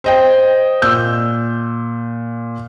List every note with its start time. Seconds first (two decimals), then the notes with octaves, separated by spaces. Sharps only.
0.04 C5 D#5 G5
0.82 A#2 E6 G6